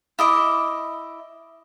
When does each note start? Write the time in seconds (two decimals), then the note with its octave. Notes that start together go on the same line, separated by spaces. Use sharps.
0.19 E4 D#5 D6